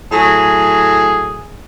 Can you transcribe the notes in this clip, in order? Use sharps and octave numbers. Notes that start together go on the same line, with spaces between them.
A2 F#3 G#4